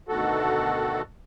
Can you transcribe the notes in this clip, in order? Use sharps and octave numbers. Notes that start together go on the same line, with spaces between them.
D2 B2 D#3 F#4 A4